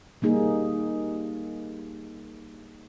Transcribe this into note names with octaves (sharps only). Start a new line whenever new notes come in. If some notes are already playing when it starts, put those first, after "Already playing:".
G3 A#3 D#4 G#4